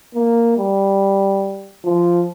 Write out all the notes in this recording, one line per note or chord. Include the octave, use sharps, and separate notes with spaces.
A#3
G3
F3